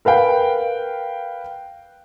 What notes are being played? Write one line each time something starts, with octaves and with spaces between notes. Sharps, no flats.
A#4 B4 F5 G5